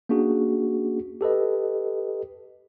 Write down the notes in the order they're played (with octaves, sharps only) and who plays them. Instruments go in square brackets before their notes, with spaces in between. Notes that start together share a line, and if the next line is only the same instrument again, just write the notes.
[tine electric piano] A#3 C#4 D4 F#4 G#4
G4 A4 B4 D#5